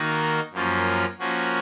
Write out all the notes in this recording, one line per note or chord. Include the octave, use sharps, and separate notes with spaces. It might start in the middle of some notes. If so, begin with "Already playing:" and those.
Already playing: D#3 A#3 D#4 F#4
F#2 F3 A#3 C#4 F4
F3 A#3 C#4 F#4